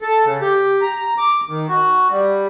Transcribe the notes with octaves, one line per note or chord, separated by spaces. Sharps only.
A4
C#3
G4
A#5
D6
D#3
F#4
G3